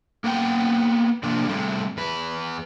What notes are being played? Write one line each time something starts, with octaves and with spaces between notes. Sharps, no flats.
A#3 B3 F#5 G5
C3 F3 A#3 D4
G3 A3 C4
E2 B4